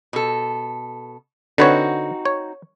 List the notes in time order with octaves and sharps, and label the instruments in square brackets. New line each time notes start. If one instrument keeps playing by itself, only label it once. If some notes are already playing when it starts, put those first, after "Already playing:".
[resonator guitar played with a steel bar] B2 A4
[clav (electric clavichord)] D3 B4 C#5 [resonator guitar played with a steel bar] C4 D#4 F#4
[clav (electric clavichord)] C#5